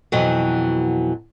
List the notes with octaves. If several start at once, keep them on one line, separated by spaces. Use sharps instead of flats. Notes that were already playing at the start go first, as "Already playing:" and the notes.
F2 B2 E3 F#3